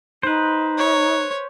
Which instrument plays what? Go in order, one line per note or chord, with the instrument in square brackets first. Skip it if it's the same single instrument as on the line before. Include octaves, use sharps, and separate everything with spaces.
[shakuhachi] D#4 [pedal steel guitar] B4 C5
[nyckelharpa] C#5